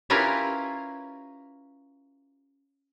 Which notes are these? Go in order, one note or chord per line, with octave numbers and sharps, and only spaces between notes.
C#4 E4 F4 G4 A#4 B4